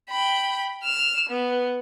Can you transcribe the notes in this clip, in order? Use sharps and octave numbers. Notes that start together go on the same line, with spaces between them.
G5 B5
F6 E7
B3